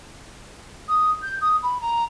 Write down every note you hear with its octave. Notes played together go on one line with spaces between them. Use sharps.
D#6
G6
D#6
B5
A#5